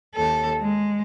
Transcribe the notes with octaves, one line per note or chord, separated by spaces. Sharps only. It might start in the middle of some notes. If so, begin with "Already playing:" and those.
D#2 A4
G#3